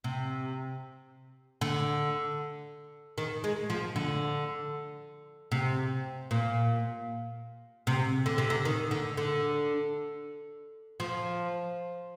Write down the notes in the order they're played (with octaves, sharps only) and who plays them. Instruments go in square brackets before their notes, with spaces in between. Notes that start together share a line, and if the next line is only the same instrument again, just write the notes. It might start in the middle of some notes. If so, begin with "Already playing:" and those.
[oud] C3
D3
D#3
G#3
F3
D3
C3
A#2
C3
D3
C3
D3
D#3
D3
D3
F3